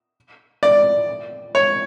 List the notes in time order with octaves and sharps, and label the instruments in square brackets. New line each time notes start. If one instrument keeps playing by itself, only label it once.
[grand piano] D5
C#5